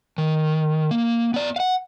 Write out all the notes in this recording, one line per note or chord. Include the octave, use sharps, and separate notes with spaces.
D#3
A#3
B3 D5
F5 F#5